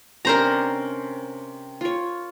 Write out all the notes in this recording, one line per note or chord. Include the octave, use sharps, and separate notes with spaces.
C3 C#4 D4 A#4 C5 A#5
F4 C#5